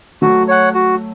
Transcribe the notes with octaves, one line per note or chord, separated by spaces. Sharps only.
F#3 A3 F#4
C#5 F#5
F#4